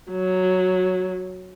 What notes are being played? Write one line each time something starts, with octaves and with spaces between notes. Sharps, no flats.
F#3